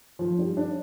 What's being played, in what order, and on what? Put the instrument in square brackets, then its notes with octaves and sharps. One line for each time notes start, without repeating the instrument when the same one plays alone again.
[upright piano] F3
G3
D4